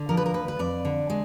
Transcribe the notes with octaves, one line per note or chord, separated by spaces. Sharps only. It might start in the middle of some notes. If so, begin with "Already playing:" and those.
Already playing: D3
F3 A#4
B4
A#4
D2 B4
B4
F2 D5
D3
G#3